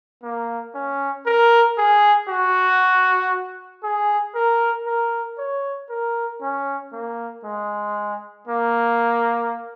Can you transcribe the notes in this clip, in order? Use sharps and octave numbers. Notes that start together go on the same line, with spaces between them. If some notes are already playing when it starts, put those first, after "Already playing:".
A#3
C#4
A#4
G#4
F#4
G#4
A#4
A#4
C#5
A#4
C#4
A#3
G#3
A#3